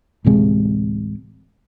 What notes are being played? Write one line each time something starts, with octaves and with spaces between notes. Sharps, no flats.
D1 A1 C3 G#3